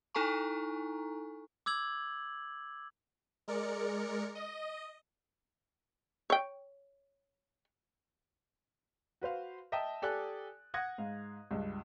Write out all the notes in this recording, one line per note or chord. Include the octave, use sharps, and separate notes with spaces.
D#4 E4 A4 G#5 A#5 C#6
D6 E6 G#6 F#7
G#3 A#4 D5 C#7
D#5
C#5 G5
F#4 B4 C5 F5
D#5 E5 G5 A5 D#6
G4 A4 D5 G#5 F#6
F#5 D#6 F#6 G#6 A#6
G#2 F5
C#2 G2